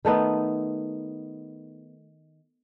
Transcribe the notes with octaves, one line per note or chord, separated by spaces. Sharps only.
D#3 A3 B3 D#4